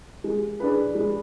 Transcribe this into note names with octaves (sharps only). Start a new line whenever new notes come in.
G#3
D4 G#4 B4
G#3